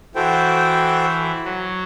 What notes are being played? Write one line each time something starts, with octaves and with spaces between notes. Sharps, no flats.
E3 F#4 A4 C5 G5
F#3